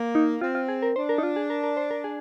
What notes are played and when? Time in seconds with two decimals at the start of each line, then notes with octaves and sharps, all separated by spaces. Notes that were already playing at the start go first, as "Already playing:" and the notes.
Already playing: A#3
0.15 D#4
0.41 C4 F4
0.55 F4
0.68 G#4
0.82 A#4
0.96 D4 C5
1.09 A#4
1.18 D#4
1.23 F4
1.36 G#4
1.50 A#4
1.63 A#4
1.77 C5
1.91 A#4
2.04 G#4